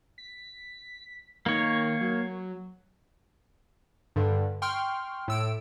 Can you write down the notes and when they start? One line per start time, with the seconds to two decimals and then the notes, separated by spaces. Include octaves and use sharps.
0.18 B6
1.46 D#3 A#3 C#5
2.01 F#3
4.16 G2 D3
4.62 G5 C6 C#6 F6
5.28 A2 E6 D7